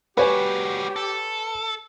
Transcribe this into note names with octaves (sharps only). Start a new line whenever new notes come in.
G3 F#4 G4 B4 C#5 G#5
A4